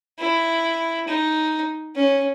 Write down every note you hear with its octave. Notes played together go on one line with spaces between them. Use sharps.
E4
D#4
C#4